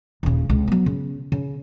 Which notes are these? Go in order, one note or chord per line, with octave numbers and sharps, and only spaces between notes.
D#1 C#3
C#2 C3
F#3 B3
C#3
C#3